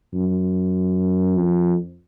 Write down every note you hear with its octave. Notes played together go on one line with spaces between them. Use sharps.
F#2
F2